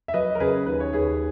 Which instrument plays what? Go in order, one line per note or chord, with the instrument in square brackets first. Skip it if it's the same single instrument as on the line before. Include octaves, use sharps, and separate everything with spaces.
[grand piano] E5
F#3 B4 D#5
A#4
C#3 G#4 B4
D#2 B4
C#5
D#2 G#4 B4